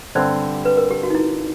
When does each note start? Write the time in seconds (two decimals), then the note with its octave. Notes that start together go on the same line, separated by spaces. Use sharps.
0.15 G2 D3 G3 C4 C5 D5
0.65 B4
0.77 A#4
0.91 G4
1.03 F#4
1.10 D#4
1.15 E4